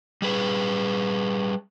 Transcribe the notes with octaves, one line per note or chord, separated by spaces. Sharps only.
G3 G#4 B4